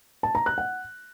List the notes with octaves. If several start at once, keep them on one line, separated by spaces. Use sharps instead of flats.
A5
A#5
F#6
F#5